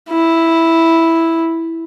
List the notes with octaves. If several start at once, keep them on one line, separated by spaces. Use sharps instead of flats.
E4